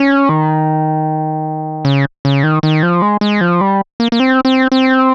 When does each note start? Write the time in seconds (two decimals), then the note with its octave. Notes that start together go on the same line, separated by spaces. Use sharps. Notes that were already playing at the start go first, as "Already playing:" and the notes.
Already playing: C#4
0.29 D#3
1.85 C#3
2.25 C#3
2.43 D#3
2.63 D#3
2.83 F3
3.02 G#3
3.21 G#3
3.41 F3
3.61 G3
4.00 A#3
4.12 A#3
4.20 C4
4.45 C4
4.72 C4